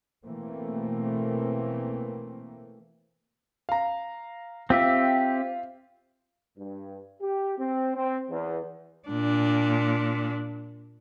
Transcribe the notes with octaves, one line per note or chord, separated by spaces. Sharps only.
B2 E3 A3 A#3 C4
F5 A#5
C4 F4 G4 E5
G2
G4
C4
C4
E2
A#2 D4